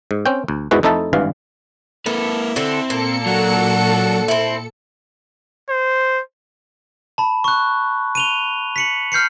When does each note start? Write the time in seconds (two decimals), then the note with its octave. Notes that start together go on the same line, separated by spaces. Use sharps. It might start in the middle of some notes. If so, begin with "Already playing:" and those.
0.11 G#2
0.26 C4 C#4 G5
0.48 D2
0.71 E2 G#2 E3 G#3 F#4 B4
0.83 F2 A3 D#4 E4 A4 A5
1.13 G#1 G2 E3 F5
2.06 A#3 E4 A4 B4
2.56 D3 C4 A4
2.90 A#2 A#3 A4 C#7
3.26 F#3 D4 F#4 F#5
4.28 C4 E4
5.69 C5
7.18 A5 B5
7.44 C#6 F#6
8.15 D#7 F7 G7
8.76 B6 C#7 F#7
9.12 F6 G6 C7 C#7